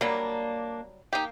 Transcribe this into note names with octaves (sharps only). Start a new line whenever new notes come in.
F#3 G3 A#3 D4
A#3 D#4 G4